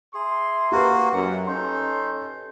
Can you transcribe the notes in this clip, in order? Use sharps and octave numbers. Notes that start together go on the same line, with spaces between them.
G#4 E5 A#5 C6
A#3 F#4 G4 B4
F#2 F#5
C#4 D#4 A4 C6